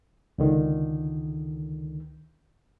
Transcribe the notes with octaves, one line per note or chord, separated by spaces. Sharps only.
C#2 D3 D#3